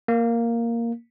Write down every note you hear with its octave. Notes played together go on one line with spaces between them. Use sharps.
A#3